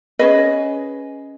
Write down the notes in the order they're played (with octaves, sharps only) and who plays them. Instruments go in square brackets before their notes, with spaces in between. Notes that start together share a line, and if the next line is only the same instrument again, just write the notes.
[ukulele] C#4 G#4 B4 D#5